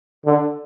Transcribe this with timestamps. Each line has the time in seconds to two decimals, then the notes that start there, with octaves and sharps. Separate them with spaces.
0.26 D3